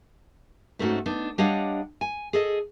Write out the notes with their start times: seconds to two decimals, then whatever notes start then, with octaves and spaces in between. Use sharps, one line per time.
0.79 G#2 A3 C4 C#4 D#4 F#4
1.06 B3 D4 D#4
1.38 G3 D4 C#5 D#5 F5 F#5
2.01 G#5
2.33 G#4 A4 D#5